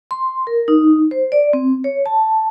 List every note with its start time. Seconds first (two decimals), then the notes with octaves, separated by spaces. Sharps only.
0.11 C6
0.47 A#4
0.68 D#4
1.11 C5
1.32 D5
1.53 C4
1.84 C#5
2.06 A5